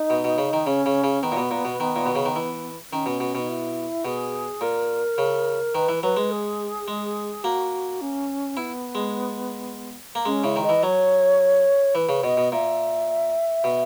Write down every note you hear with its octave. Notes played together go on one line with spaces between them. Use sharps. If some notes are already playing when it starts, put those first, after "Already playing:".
Already playing: D#4
B2
B2
C#3
D#3
C#3 C#4
C#3
C#3
D#3 B3
A#2
B2
A#2
B2
D#3
A#2
B2
C#3
D#3
E3
D#3 C#4
B2
B2
B2 D#4
E4
B2 G#4
A#2 A#4
C#3
D#3 B4
E3
F#3 B4
G#3
G#4
G#3
A#3 F#4
C#4
B3 E4
G#3
A#3
G#3 C#4
C#3 E4
D#3
D#5
E3
F#3 C#5
E3 B4
C#3
B2 D#5
B2
A#2 E5
B2